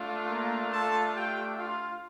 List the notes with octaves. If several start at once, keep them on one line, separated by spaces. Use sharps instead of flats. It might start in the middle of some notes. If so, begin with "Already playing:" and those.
Already playing: A3 D4 F4
A#3 A#4
A4 A5
G4 G5
F4 F5